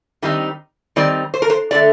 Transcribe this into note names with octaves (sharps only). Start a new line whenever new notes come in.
D#3 G3 C4 D#4
D#3 G3 C4 D#4 D5
C5
A#4
C5
D3 A3 D5